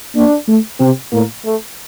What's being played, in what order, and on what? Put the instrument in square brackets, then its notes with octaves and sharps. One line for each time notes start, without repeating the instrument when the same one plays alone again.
[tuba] A#3 [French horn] D4
[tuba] A3
[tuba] C3 [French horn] C4
[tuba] A2 [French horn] A#3
[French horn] A3